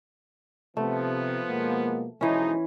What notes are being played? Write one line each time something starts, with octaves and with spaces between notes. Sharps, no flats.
C3 F3 A3 B3
B2 G#3 A#3
B1 E3 F3 G#3 C#4 D#4